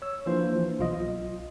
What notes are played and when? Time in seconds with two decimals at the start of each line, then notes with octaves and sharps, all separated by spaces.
0.02 C#5 E6
0.26 E3 F3 A#3 D4 F4 C5
0.79 B1 F4 D#5